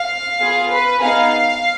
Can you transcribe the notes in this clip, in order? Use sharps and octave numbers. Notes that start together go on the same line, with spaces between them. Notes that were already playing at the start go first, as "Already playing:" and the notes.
Already playing: F5
B3 F4 G#4
B4
B3 D#4 G#4 F5